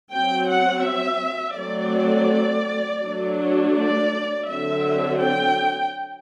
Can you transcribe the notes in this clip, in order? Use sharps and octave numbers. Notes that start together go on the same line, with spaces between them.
F#3 C4 G5
F#5
E5
F#3 A3 C4 D5
F#3 A3 D4
D5
D3 F#3 C4 E5
G5